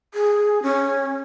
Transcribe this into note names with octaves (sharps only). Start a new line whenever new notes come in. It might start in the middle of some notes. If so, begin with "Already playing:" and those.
G#4
C#4